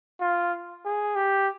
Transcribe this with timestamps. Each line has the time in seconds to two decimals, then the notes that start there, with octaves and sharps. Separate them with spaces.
0.20 F4
0.85 G#4
1.16 G4